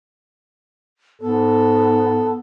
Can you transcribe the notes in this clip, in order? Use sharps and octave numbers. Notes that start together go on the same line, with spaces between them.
G#2 B3 A4